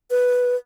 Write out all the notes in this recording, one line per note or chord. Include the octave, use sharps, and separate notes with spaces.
B4